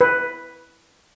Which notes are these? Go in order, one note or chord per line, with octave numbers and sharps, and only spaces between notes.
B4